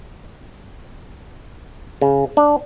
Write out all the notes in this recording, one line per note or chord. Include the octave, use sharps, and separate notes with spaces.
C#3
D4